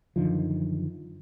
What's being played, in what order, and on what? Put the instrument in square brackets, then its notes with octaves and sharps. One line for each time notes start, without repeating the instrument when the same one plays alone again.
[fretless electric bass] F#2 D3 D#3 F3